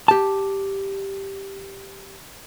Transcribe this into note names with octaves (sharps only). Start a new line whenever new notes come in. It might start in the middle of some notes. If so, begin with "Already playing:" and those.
G4 A5